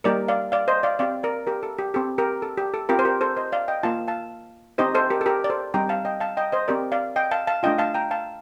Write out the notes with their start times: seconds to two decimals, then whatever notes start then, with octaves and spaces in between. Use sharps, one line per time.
0.04 G3 A#3 D#4 G4 A#4 D5
0.28 D5 F5
0.52 D5 F5
0.68 C5 D#5
0.83 D5 F5
0.99 C4 G4 D5 F5
1.23 A#4 D5
1.47 G4 A#4
1.63 A4
1.78 G4
1.94 C4 G4 A4
2.18 G4 A#4
2.42 A4
2.58 G4
2.74 A4
2.89 C4 F4 G4 A#4
2.99 C5
3.05 G4 A#4
3.21 A4 C5
3.37 C5 D#5
3.52 D5 F5
3.68 D#5 G5
3.83 A#3 F4 F5 A5
4.08 F5 A5
4.78 C4 D#4 G4 C5 D#5
4.95 A4 C5
5.10 G4 A#4
5.21 A4
5.26 G4 A#4
5.44 D5
5.50 A4 C5
5.74 G3 C4 D#4 G4 G5 A#5
5.89 F5 A5
6.05 D#5 G5
6.20 F5 A5
6.37 D#5 G5
6.52 C5 D#5
6.68 C4 G4 A#4 D5
6.92 D5 F5
7.16 D#5 G5
7.31 F5 A5
7.47 F5 A5
7.63 A3 D4 F4 D#5 G5
7.78 F5 A5
7.94 G5 A#5
8.11 F5 A5